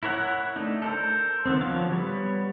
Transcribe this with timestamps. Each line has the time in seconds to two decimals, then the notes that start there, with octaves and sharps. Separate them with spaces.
0.03 E4 A#4 C#5 F#5
0.56 A3 D4 D#4
0.82 A4 A#4 C5
1.46 D#3 B3 C4
1.61 D3 F3 F#3 C#5 F5
1.91 G3 B3 C#5